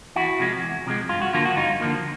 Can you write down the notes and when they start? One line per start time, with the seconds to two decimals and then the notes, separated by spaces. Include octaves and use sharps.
0.16 E2 E4 F#4
0.39 C3 F3 G#3
0.62 E2
0.86 C3 F3 G#3
1.09 G2 F4
1.22 F#4
1.33 D3 F3 A#3 F4
1.46 F#4
1.56 G2 D#4 F4
1.81 D3 F3 A#3